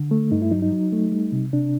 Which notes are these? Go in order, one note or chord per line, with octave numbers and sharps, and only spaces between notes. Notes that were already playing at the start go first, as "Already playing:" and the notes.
Already playing: D3
A3
G2 D#4
E4
F#3 D#4
D#4
F#3
A3
G3
C3
C3 D4